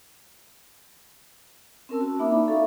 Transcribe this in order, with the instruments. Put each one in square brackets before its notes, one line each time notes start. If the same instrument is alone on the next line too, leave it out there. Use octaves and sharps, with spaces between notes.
[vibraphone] C4 C#4 A#4 A5 E6
F#4 A5
A#3 D#4 E5 B5 D6
D#4 E4 D5 A#5 B5
A4 E5 F5 C#6